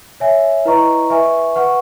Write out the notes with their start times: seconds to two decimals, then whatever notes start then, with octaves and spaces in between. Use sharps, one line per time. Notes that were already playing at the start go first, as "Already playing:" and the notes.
0.20 C#5 E5 G#5
0.65 E4 B4 D#5 A#5 C#6
1.10 B4 E5 G#5 C#6
1.55 B4 F#5 C#6